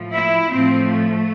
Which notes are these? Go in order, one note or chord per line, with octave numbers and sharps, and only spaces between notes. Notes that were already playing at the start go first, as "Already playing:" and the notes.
Already playing: A2 F3
E4
A2 F3 C4
A3